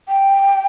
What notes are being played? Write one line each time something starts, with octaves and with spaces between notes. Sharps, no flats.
G5